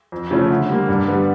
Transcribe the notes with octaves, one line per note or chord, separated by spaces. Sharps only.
F2
C#3 F3 A3 C#4
D3
G3 A#3
G2
D3 G3 B3